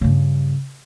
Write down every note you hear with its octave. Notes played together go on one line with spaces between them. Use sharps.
G2 C#3